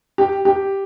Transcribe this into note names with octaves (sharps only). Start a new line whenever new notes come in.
G4
G4